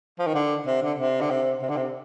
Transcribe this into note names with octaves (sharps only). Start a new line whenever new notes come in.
F3
D#3
D3
C3
D3
C3
D3
C3
C3
D3
C3